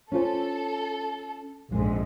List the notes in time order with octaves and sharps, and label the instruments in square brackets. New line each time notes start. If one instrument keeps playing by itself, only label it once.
[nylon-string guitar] C#4 F4 C5 [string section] A4
[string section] A#1 F2 G#2 [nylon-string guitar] G#3